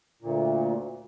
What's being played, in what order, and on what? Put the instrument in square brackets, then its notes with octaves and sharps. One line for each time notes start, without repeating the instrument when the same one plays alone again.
[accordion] D2 A#2